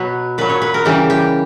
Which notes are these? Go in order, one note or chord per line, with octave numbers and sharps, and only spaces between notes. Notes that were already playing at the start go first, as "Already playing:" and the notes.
Already playing: B2 F#3 B4 C#5
A#2 F#3 B4
C#5
B4
A#4
C#3 E3 G3 G4
G4